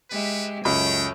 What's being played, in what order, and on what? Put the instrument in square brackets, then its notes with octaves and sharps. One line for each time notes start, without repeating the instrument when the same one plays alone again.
[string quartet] G#3 G4 E5 [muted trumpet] B4
[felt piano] C#2 [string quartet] F#2 A3 C#4 [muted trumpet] G5